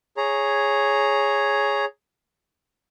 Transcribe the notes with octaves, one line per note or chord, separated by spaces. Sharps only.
G#4 C#5 A#5